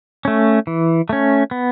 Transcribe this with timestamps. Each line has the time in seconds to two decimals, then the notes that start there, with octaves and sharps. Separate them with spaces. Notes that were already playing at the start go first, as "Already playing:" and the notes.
0.25 A3 C#4
0.67 E3
1.09 A3 C#4
1.51 B3